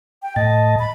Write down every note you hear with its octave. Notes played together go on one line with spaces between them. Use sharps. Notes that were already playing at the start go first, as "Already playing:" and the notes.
G5
A2 D#5 A5
B5